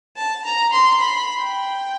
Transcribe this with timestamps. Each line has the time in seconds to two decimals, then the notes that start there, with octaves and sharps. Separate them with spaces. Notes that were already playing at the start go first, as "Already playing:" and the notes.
0.17 A5
0.45 A#5
0.73 C6
1.01 B5
1.43 G5